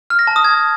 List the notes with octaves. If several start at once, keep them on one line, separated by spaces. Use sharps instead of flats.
F6
A#6
A5
D#6
G#6